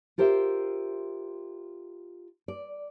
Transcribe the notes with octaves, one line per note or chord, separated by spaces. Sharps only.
F4 G4 A#4 C5 D#5 E5
D5